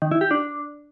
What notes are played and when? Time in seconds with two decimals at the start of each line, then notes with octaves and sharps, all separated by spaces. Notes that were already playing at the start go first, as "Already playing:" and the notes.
0.02 D#3
0.11 E4
0.21 G4
0.31 D4